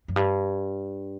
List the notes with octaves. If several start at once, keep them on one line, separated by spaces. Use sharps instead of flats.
F#2
G2